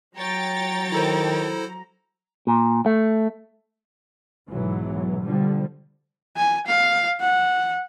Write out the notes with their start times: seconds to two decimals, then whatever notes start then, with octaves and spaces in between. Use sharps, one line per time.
0.16 F#3 C#5 G5 A#5 A6
0.92 D#3 E4 A4 C5
2.47 A#2
2.86 A3
4.50 B1 G#2 E3 F#3
5.22 B2 D3 F3 G3
6.37 G#5
6.67 F5
7.21 F#5